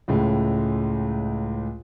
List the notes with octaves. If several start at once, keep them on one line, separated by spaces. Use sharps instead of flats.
C#2 A2 G#3